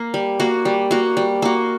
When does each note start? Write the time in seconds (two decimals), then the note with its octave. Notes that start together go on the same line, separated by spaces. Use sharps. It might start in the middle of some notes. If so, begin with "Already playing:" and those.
Already playing: A#3
0.14 G3
0.40 A#3 F#4
0.65 G3
0.91 A#3 F#4
1.17 G3
1.42 A#3 F#4